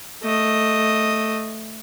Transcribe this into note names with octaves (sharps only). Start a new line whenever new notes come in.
A3 D#5